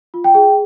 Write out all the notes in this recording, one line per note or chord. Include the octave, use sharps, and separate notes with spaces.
F4
G5
G#4